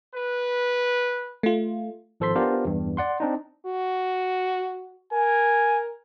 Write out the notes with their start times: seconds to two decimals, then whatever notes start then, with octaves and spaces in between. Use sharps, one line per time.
0.15 B4
1.43 A3 F4
2.20 G#1 F3 A4 C5 C6 B6
2.35 B3 D4 F4 G4 A#4 C5
2.65 E2 G2
2.97 D5 F#5 C6
3.20 C4 D4 D#4
3.66 F#4
5.13 A#4 G#5